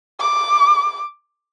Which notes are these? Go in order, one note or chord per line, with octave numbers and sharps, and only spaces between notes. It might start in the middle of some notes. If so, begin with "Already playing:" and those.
D6